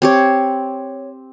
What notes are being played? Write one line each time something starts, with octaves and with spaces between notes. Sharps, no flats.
C4 G4 C#5